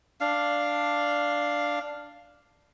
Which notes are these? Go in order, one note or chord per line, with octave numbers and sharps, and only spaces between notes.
D4 F5